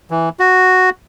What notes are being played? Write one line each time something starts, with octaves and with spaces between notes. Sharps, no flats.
E3
F#4